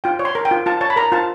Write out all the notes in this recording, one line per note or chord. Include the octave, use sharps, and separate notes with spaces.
F4 G5
C#5
C6
A#4
G5
F4
F4 A5
C#5 A5
B5
A#4 A#5
F4 A5